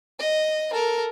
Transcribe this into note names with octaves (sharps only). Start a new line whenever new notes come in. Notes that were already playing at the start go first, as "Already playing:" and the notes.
D#5
A4 A#4